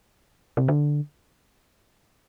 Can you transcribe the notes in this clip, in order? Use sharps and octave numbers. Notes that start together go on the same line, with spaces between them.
C3
D3